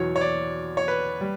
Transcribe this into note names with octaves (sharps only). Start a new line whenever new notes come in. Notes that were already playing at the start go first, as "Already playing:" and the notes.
Already playing: E2 B2 F#3 C#5
C#5
D5
C#5
B4
G3